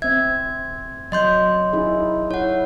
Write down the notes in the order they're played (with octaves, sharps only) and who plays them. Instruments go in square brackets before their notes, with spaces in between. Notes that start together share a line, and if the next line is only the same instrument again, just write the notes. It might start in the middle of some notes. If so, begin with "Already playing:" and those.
[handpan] C4 E5 [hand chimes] G#6
[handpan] F#3 [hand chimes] D#5 C6 G6
[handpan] D#4 E4 G#4
[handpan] E4 [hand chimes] C#5 F#5